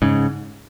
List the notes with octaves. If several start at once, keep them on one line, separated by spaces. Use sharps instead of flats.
G#2 C#3